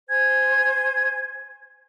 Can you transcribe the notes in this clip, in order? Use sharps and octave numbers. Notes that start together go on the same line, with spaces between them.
C5 G#5 G#6